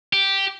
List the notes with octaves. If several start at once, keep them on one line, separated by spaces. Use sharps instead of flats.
G4